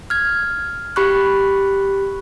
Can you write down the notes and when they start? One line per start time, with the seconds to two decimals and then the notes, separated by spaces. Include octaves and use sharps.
0.10 F6 G#6
0.96 G4 B5 C#6 F#6